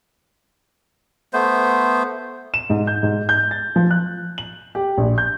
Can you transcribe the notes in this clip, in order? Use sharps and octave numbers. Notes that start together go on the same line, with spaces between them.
A3 B3 C5
E7
G#2
G6
G#2
G6
A6
F3
F#6
F#7
G4
A#1
G6